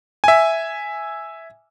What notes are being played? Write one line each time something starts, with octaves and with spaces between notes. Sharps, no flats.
E5 G#5